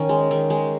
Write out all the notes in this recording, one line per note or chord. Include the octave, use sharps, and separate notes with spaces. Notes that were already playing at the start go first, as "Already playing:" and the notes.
Already playing: D#3 C#4
G#3
D#3
G#3